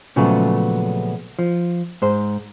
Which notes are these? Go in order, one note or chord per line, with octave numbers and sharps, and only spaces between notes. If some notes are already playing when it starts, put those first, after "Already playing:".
A#2 C#3 F3 F#3 A3 B3
F3
G#2 C5